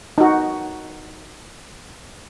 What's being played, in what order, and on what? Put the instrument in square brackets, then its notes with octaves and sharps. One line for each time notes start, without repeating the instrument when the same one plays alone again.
[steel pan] D#4 F#4